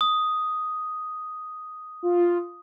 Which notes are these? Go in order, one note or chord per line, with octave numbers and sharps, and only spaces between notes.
D#6
F4